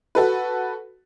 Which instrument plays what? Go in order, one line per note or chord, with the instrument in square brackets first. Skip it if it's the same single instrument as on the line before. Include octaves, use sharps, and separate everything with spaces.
[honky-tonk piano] F#4 A4 B4